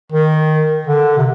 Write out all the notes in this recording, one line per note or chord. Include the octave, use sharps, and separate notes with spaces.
D#3
D3
C3